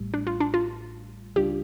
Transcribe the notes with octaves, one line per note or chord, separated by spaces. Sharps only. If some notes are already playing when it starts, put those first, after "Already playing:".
Already playing: A1 A2 G3
D4
F4
D4
F4
C#2 C#3 G3 D4 F4 G4